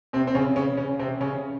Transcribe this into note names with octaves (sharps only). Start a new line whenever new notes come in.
C3 C4
C4
C#3 C#4
C#3 C#4
C#3 C#4
C3 C4
C#3 C#4